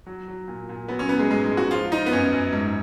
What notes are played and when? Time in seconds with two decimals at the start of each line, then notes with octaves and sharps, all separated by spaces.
0.06 F#3
0.28 F#3
0.48 A#2
0.69 A#2
0.88 F#3 B3
0.99 C#4
1.09 F#3 B3
1.19 G#3
1.30 G#2 G#3
1.44 G#3
1.51 G#2
1.57 F#4
1.71 F3 F4
1.92 F3 D#4
2.06 B3
2.12 F#2 C#4
2.32 F#2
2.53 G#2